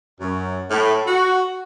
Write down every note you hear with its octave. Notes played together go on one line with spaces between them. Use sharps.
F#2
A2
F#4